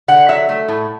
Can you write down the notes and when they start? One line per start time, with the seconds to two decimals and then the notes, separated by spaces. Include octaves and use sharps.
0.08 D3 F#5
0.28 F#3 E5
0.49 A3
0.68 A2